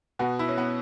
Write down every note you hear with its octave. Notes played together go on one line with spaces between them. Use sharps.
B2 B3 F#4
E4
C#4
B3